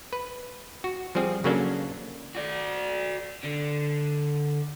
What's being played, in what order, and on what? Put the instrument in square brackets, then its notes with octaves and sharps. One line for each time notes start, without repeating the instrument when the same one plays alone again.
[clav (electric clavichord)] B4
F#4
F3 G3 C4 G#4
C#3 F#3 A#3 C#4 D4 A4
[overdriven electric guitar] F#4 D5
D3